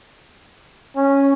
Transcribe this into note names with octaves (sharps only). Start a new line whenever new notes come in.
C#4